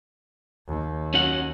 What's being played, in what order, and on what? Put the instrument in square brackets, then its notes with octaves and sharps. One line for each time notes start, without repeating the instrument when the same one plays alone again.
[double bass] D#2
[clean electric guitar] C#4 F#4 F#5